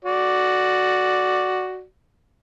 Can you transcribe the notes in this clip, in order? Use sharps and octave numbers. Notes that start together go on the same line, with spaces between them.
F#4 D5